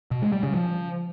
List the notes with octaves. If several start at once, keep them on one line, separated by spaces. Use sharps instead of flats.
B2
G#3
G3
C#3
F3